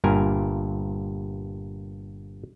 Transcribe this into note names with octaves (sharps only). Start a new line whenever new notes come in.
G1 G2 A#2 A#4 G#5